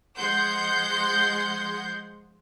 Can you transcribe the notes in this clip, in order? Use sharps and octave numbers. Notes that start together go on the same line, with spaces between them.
F3 G#3 F#5 C6 G6